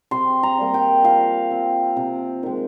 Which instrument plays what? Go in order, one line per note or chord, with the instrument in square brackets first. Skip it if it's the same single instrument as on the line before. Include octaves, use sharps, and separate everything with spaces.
[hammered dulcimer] C3 C6
A#5
G3 A#3
G5
F3 F5
C4
C3
D#3 G#3